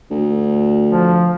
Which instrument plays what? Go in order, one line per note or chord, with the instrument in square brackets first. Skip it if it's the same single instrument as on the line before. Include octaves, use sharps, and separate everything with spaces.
[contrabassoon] D2
[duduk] F3